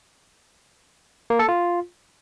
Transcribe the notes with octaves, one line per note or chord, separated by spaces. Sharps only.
A#3
A4
F4